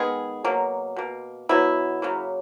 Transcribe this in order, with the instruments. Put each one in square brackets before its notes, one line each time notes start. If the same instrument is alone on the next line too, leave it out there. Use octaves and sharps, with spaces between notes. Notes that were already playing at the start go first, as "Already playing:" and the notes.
Already playing: [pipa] D#3 G#3 B3 G#4
B2 F#3 A#3
B2 A#3
B2 F#3 B3 E4
C#3 F#3 A#3